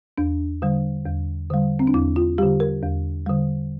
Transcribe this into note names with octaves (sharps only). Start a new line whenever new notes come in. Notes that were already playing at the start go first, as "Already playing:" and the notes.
E2 D4
D3 G3
E2
D3 G3
C4
D4
E2 E4
F4
D3 G3 G4
A#4
E2
D3 G3